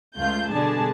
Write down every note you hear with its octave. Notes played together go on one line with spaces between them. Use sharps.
C#2 A3 F4 G6
B2 D3 G3 D4 G#4 A5